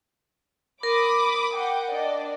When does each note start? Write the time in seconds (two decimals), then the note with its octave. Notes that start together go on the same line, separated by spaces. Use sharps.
0.83 A#4 B5 D6 D#6
1.55 F#5 G5
1.93 D4 D5 D#5